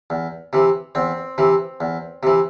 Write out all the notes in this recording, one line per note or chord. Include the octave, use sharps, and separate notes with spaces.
E2
C3 E3
E2 C4
C3 E3
E2
C3 E3